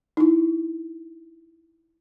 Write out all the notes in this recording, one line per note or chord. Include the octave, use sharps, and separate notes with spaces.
D#4 E4